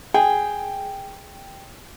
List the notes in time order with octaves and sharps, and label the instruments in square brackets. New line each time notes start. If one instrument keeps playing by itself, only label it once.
[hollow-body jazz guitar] G#4 [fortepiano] G5